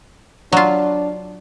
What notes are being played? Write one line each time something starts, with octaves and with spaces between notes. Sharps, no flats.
F#3 D4 F4